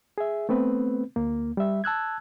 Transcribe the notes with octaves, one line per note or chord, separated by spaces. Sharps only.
G#4 E5
A3 B3 C4 B4
D2 A#3
G3 E5
A5 E6 F#6 G#6